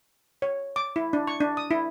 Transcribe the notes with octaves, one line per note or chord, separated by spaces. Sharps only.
C#5
D6
E4
D4
C#6
D4
D#6
E4